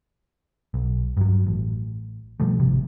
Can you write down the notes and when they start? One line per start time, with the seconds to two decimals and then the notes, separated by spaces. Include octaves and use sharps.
0.74 B1
1.17 G2 F#3
1.47 A1
2.40 B2 F3 G3 A3
2.60 G#1 C3